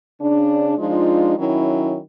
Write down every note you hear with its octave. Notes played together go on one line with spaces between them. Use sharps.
C#3 D4
F3 G#3 D4 D#4 F4
D#3 F#3 C#4 E4